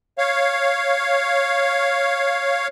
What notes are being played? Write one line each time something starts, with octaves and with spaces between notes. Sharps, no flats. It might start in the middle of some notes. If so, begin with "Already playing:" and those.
C#5 F5